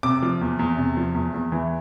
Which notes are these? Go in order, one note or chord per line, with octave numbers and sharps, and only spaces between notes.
C3 D6
F3
E2
E2
C3
F3
E2
E2
E3